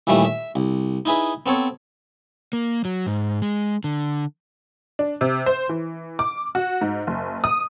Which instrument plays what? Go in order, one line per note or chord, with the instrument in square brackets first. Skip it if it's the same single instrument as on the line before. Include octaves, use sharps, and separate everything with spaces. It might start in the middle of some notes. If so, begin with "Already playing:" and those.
[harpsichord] D#2 A#2 E3 G3 A3
E5
C2
D#4 E4 G#4 B4
B3 C4 A4 C#5
[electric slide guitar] A#3
F#3
G#2
G#3
D3
[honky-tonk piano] D4
C3
C5
E3
D6
F#4
G#2
F#1
D#6